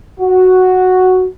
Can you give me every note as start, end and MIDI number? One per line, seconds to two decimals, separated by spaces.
0.20 1.25 66